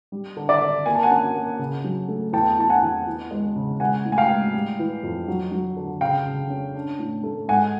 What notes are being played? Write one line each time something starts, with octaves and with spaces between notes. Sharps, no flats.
G3
D3
D5 E5
D3
A#3 G#5
A5
F#5 G#5
C#4
A#3
C#3
F#3
A3
E2 G5 A5
E3 A5
F#5 G#5
E2
E3
G#3
C#3
G#3 F#5 G#5
A2
G#5
F5 G5
G#3
G3
E3
F2
F#3
F#3
D3
C#3 F5 G5
C#3
C#4
D4
A2
A3
G#2 F#5 G#5